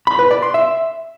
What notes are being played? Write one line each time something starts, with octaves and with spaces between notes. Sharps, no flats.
B5
B4
D5
C6
E5